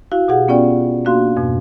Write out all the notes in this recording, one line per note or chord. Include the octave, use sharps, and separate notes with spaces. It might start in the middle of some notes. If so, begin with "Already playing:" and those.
E4 F#4 F5
B2 G4 G#4 F#5
B3 C#4 F4 D5 G5
A#3 D4 F#4 F5 C6
F2 G#2 B2